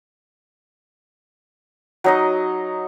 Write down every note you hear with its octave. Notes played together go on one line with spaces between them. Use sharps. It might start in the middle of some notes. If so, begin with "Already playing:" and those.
F#3 D#4 D#5